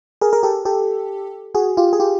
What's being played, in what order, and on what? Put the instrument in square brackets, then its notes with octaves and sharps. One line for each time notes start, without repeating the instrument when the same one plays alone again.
[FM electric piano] G#4 A#4
G#4 A#4
G4 A4
G4 A4
F#4 G#4
F4 G4
G#4
F4 G4